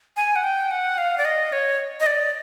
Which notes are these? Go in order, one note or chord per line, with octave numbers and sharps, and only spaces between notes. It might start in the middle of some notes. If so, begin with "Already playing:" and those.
G#5
F#5
G5
F#5
F5
D5
D#5
C#5
D#5
D5